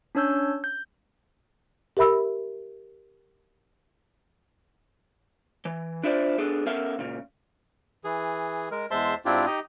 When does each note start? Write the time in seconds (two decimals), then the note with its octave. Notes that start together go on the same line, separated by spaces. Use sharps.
0.15 C#4 D4 C#5 E6 G6
0.64 G6
1.97 G4 A#4 E5 B5 E6
5.65 E3
6.03 D4 E4 F4 C5 D5
6.38 B3 D4 G#4 A4
6.66 B3 C#4 A4 A#4 E5 F5
6.99 A#2 C#3
8.04 E3 G#4
8.71 G#3 A#4
8.91 E2 G#3 C5 E5 A5 C6
9.26 G#2 C4 D4 E4 F4 G4
9.46 D#4 G4 D#5